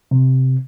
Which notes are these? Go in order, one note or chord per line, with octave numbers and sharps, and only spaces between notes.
C3